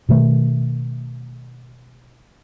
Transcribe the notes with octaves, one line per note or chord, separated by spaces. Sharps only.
B2 D#3 A3